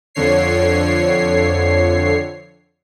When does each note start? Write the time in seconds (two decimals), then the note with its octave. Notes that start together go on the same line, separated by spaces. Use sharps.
0.15 F2 D3 C#5 C7